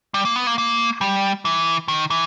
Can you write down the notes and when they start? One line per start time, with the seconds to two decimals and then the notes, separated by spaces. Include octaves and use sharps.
0.14 G3
0.25 A#3
0.36 B3
0.47 A#3
0.58 A#3
1.01 G3
1.45 E3
1.88 D#3
2.10 E3